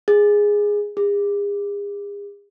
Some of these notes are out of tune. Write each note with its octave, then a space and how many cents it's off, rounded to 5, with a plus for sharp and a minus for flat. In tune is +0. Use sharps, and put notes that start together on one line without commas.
G#4 -5
G#4 -40